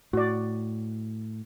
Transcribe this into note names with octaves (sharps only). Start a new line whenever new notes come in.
A2 F#4 D5